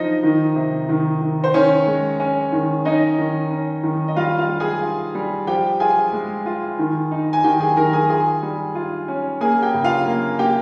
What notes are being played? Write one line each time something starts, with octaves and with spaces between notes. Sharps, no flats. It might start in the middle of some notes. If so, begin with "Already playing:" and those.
Already playing: F3 D#4 D#5
D#3
C3
D#3
D#3
C5
D#3 C#4 C#5
G#3
C#4
D#3
C#4 D#4 D#5
D#3
C#4
D#3
D#5
G3 F4 F5
F4 F5
G3
G#4 G#5
F4
G3
F3 G4 G5
F4 G#4 G#5
G#3
F4
D#3
D#4
G#5
D#3 G4 G5
G#4 G#5
D#3 A#4 A#5
G#4 G#5
F4 G#4 G#5
G3
F4
C#4
A#3 G#4 G#5
G4 G5
C#3
F4 F5
A#3
A#3 G4 G5